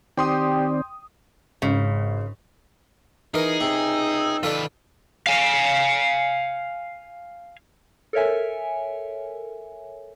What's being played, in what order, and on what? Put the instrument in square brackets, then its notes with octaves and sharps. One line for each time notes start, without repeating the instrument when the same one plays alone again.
[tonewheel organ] D#3 C4 D5 [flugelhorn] G4 [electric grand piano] G5 C6 D#6
[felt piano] G#1 [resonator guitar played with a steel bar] C#3
[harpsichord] E3 A#4 [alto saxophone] D#4 [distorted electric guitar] G#4
[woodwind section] C#2 G5 E6 [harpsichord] C3
[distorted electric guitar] D#3 B4 [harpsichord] F4 A4 D5
[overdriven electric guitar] F5 G#5
[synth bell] A4 A#4 C#5 E5 G#5